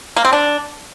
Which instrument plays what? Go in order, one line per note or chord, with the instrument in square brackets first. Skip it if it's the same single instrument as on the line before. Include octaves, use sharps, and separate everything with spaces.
[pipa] A#3
C4
D4